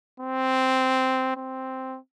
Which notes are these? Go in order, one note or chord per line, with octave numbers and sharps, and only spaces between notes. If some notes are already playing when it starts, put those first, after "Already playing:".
C4
C4